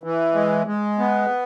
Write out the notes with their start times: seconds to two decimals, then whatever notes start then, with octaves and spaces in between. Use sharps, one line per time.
0.04 E3
0.35 G#3
0.67 G#3
0.99 B3